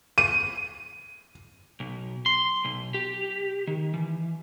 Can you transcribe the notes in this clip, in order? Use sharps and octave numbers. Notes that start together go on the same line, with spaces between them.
D#7
B1
C6
B1
G4
D#3
E3